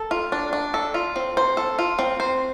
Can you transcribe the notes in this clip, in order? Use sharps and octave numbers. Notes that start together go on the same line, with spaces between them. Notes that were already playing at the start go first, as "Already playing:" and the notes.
Already playing: A4
F4
D4
D4
A4
F4
C4
C5
A4
F4
C4
C5